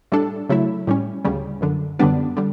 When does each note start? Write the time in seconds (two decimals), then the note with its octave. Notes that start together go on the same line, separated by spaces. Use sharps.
0.12 A2 G3 D4 A4
0.49 C#3 F#3 A3 E4
0.87 A2 G3 C#4
1.25 D2 C#3 G3
1.61 G1 F#2 D3
1.99 F#2 D3 G3 B3 D4
2.37 D3 G3